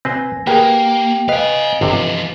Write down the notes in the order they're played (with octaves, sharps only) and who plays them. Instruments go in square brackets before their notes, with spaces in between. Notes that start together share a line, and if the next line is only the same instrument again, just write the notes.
[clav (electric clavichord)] C4 B4 C5 [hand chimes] G#5 A#6
[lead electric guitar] A#3 [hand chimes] G4 G5 [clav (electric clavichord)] G#4 A#4 B4
[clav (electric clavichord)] B4 [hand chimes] D#5 [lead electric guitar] F5 G#5
[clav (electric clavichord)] G1 C3 [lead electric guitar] E3 F3